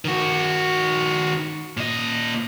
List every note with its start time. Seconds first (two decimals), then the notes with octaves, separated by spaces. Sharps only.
0.05 D#3 F#4
1.77 A#2 D#5